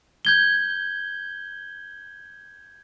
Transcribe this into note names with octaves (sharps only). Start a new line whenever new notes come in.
G6 G#6 G7